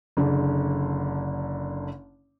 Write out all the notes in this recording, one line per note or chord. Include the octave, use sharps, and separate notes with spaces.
F#1 D3